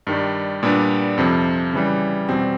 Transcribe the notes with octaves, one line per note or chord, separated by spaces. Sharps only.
G2 D#3 G3
A#2 G3 B3 D4
F2 C3 F3
C#3 E3 G3
E2 B2 G3 C4